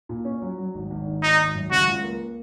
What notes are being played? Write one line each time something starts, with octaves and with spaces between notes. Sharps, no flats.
A#2
C#4
F#3
F#3
G#1
G#1
D#3
G#1 D#4
G#1
F#2
C#3 F#4
C#2
A#3